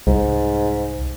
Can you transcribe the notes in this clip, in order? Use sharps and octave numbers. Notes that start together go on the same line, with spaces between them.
C2 G#2